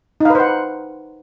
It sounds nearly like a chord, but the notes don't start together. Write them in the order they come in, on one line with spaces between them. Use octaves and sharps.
D#4 F5 B4 C5 F#5